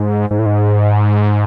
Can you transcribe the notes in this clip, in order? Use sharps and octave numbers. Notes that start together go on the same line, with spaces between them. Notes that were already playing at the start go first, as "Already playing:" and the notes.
Already playing: G#2
G#2
A2
G#2